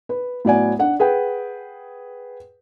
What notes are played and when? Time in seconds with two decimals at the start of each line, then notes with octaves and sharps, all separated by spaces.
0.09 B4
0.45 A2 F#3 B3 D5 F#5 G#5
0.79 D4 F#5
0.99 G#4 B4 F#5 G5